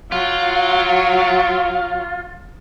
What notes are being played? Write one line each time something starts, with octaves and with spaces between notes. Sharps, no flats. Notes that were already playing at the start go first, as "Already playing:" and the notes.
F#3 F4